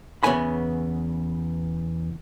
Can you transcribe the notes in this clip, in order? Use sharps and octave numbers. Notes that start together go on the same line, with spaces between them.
E2 C#3 B3 C#5 G#5 B5